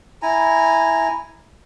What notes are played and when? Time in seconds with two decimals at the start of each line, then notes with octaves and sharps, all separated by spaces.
0.22 E4 G#5 A#5